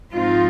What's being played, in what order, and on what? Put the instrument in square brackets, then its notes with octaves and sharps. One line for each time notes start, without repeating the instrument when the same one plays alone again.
[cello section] G#2 F3 C4 D#4 F4